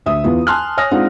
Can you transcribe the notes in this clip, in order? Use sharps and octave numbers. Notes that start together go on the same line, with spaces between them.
D2 E5 D#6
E2 B3 E4 F4
G#5 A5 C6 F6 F#6
C#5 G#5 D#6 F6 A#6
G#3 C4 D4 D#4 F4 F#5